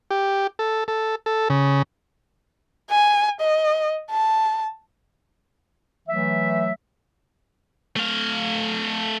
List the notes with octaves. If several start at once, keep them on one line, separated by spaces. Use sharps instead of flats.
G4
A4
A4
A4
C#3
G#5
D#5
A5
E3 F#3 A3 E5
A3 F5